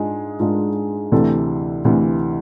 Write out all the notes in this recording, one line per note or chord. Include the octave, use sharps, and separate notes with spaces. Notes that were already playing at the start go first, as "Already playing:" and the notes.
Already playing: G#2 G#3 D4 F4 G#4
G#2 G#3 D4 F4
D2 C3 E3 A4
D2 C3 E3